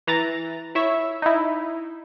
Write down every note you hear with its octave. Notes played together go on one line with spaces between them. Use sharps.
E3 A#5 A6
E4 C#5 E5
D#4 E4